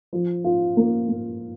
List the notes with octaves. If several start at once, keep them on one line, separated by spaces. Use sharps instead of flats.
F3
F4
A#3
A#3